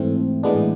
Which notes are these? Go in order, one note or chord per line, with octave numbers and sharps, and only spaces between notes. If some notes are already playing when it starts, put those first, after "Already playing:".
Already playing: G#2 E3 A3 C4
A2 E3 G#3 B3 D4